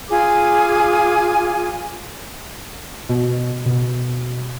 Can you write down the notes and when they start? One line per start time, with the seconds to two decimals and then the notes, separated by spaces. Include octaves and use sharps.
0.09 F4 G#4 G#5 D6
3.09 B2
3.66 B2